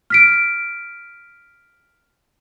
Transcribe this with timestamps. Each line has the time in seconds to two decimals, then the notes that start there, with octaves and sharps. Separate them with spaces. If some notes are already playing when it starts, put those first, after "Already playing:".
0.10 F6 B6 D7